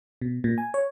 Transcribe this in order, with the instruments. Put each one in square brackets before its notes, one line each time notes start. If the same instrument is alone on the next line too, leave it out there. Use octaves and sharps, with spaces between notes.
[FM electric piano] B2
A#2
G#5
C#5